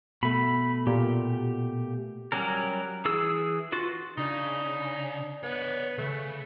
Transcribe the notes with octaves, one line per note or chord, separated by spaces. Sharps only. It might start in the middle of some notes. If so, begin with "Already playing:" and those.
B2 A3 B5
A#2 G4
F#3 G3 C#4 A#4
E3 G#4 E6
F4 F#4 B4
C#3 D4 D#4
B3 C#5 D5
C#2 C#3 A3